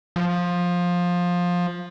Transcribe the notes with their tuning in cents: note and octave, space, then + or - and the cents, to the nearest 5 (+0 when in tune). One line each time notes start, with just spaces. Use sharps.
F3 +15